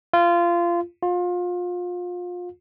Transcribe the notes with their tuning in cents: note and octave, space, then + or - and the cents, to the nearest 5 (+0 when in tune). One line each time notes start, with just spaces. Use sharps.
F4 -20
F4 +30